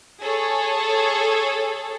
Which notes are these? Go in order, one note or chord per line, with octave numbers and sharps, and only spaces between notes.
G#4 A4 C#5